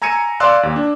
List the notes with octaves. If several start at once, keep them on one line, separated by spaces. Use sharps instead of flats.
G#5 A#5 E6 G#6 C#7 D#7
D5 F5 C6 D6 E6 F#6
D#2
D4